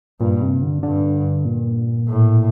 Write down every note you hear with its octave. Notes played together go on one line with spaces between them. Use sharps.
G2 A#2
C3
D3
G2 D3
A#2
A2